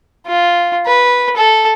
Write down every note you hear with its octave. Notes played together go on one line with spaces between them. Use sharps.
F4
B4
A4